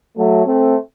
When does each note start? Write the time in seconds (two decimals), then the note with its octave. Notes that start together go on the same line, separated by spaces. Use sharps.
0.17 F#3 A3
0.46 A3 C4